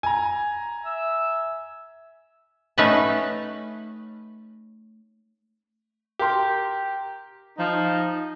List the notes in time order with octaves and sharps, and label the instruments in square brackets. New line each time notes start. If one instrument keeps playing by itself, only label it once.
[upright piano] G#5 A#5
[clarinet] E5
[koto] A3 C#4 D#4 B4 F#5 A5
[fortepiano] G4 A#4 C6
[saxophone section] F3 D#4